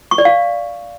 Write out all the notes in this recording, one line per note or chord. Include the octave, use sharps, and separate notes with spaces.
C#6
D5
F5